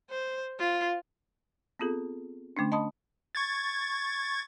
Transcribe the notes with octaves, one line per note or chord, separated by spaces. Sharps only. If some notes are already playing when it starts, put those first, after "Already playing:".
C5
F4
B3 C4 F4 G#4 A4
D3 A3 C#4 D4
D#5 A5 B5 C6 D#6
C#6 G#6 A6